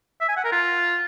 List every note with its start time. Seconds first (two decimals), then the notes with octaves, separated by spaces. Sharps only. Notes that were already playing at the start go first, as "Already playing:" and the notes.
0.21 E5
0.29 G#5
0.37 F#5
0.44 A#4
0.52 F4